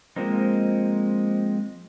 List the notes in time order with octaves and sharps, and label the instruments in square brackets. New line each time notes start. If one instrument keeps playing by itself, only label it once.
[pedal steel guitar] F3 G#3 A#3 C4 D#4